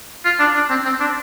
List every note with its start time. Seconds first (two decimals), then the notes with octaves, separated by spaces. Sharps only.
0.25 F4
0.40 D4
0.55 D4
0.70 C4
0.85 C4
1.00 D4